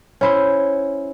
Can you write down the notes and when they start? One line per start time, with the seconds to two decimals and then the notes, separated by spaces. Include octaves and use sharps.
0.21 C#4 E4 C5